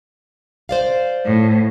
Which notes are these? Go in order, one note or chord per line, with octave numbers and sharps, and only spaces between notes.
C5 D5 F5
A2